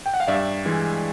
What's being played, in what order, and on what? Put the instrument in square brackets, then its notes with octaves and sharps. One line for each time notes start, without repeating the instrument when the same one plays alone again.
[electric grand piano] G5
F#5
F5
G2 D5 E5
E3 G#3